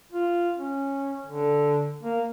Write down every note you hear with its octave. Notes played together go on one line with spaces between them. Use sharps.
F4
C#4
D3
A#3